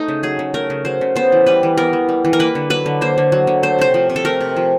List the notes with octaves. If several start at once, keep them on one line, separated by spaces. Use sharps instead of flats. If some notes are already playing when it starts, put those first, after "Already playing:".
Already playing: A3 D#4
C#3
F#3 G#4
C#3
A3 A#4
C#3
F#3 C5
C#3
B3 C5
E3
G3 B4
E3
B3 A#4
E3
G3
E3
A#4
A#3 B4
D3
F#3 B4
D3
A#3 C5
D3
F#3
D3
A3 C5
C3 C5
F3
C3
A4
A3 A#4
C3
F3